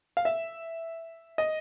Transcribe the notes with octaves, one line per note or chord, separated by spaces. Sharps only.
F5
E5
D#5